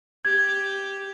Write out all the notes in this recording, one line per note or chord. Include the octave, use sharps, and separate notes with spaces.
G4 G#6